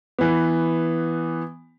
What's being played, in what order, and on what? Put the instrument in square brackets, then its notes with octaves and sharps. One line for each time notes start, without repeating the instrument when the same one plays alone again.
[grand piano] E3 B3